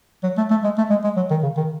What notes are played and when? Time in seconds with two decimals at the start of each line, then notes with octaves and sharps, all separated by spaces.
0.24 F#3
0.38 A3
0.51 A3
0.64 G#3
0.78 A3
0.90 G#3
1.04 G#3
1.16 F#3
1.31 D#3
1.43 C#3
1.57 D#3